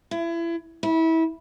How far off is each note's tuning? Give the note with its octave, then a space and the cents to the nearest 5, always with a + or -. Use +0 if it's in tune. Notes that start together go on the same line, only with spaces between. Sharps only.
E4 +30
E4 -25